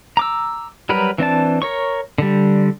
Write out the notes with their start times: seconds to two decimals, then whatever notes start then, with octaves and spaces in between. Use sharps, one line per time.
0.17 A#5 D6 E6
0.89 F#3 G3 A#4 B4 B5
1.18 E3 C4 D4 A5
1.62 A#4 C#5 C#6
2.18 D3 G3